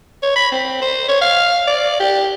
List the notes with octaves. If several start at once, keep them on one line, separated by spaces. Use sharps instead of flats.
C#5
B5
C4
C5
C#5
F5
D5
G4